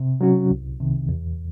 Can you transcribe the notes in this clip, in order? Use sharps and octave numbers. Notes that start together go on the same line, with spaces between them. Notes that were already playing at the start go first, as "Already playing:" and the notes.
Already playing: C3
F#3 C#4 F#4
C2
C3 D#3
E2